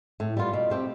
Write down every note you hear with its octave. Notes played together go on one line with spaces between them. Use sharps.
A2
G3 B3 F4
B2
A3 C4 G4